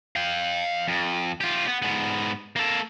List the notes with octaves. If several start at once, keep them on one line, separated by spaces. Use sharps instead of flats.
F5 G5
F2
F4 G4
B3
G#2 B3
A#3 A4